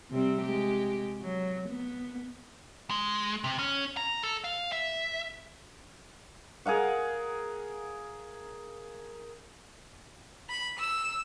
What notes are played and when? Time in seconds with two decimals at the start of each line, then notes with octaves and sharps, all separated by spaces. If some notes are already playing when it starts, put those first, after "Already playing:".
0.11 C3 G3 C4
0.42 G#3 G4
1.22 F#3
1.69 B3
2.90 G#3
3.44 C3
3.59 C#4
3.97 A#5
4.23 A4
4.44 F5
4.72 E5
6.66 G#4 A#4 F5 F#5
10.49 B5
10.79 E6